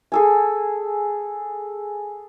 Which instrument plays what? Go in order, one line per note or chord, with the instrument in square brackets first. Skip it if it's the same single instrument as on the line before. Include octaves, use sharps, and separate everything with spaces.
[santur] G#4 A4 G#5